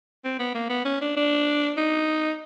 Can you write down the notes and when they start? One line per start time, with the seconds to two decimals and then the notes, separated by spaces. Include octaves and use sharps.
0.25 C4
0.39 B3
0.55 A#3
0.70 B3
0.85 C#4
1.01 D4
1.17 D4
1.78 D#4